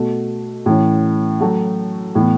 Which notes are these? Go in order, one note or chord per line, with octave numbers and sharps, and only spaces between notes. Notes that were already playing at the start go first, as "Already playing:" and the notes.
Already playing: B2 A3 F#4
A2 E3 C#4
F#3 A3 F#4
A2 E3 B3